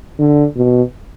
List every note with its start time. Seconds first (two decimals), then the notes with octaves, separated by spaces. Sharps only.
0.19 D3
0.57 B2